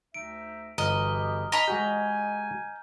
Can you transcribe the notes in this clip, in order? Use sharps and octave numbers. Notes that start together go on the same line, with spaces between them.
D2 D#4 E5 D7
G1 E3 F#4 G4 D#5 A#5 F6 G7
D#5 A#5 B5
G#3 F#4 G4 G#5 G6